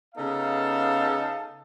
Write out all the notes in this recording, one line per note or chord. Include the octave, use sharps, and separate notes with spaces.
C#3 B3 D#4 A4 F5 A5